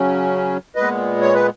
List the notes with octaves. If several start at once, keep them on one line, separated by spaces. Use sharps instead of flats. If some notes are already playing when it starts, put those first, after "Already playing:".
Already playing: C#3 F#3 C#4
A#2 G#3 B3 B4 D#5
C#5
B4